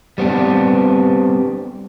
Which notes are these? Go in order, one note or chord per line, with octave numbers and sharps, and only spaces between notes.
G3 B3 C4 D4